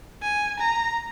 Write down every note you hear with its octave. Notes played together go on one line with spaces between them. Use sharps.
G#5
A#5